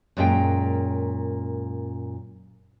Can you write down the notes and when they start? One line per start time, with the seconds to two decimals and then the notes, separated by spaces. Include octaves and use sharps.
0.17 F#2 A#2 G#3 C#4 G5